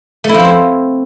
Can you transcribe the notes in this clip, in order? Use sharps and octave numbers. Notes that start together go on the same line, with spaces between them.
A3
E4
F3
C4
E4